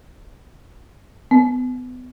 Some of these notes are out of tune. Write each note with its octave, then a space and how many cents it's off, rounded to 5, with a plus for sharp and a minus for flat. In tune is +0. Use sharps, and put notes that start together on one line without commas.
B3 +30